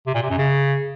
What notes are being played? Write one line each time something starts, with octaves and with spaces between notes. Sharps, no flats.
C3
A#2
C3
F#2
C#3